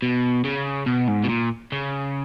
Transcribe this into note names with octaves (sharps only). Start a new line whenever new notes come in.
B2
C#3
B2
G#2
B2
A#2
C#3